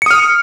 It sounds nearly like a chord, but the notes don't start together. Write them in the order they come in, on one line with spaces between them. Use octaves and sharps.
C#7 D#6 F6